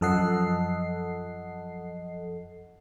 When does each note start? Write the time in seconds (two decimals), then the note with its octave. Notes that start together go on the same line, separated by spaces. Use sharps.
0.01 F#2 F3 A4 D#5 F#5 C7